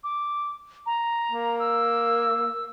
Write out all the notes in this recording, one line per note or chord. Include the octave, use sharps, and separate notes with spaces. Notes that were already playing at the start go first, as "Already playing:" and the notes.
D6
A#5
A#3
E6